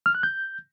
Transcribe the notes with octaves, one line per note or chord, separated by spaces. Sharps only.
F6
F#6
G6